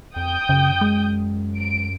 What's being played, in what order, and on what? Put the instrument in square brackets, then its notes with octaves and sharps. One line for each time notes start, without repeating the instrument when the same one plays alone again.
[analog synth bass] F2 [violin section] G5 D#6 G6
[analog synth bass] F#2 [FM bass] C#3
[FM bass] G#3
[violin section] D7